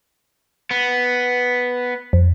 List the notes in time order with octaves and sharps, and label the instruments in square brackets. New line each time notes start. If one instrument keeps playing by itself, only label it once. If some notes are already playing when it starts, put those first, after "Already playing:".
[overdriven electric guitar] B3
[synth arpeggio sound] F2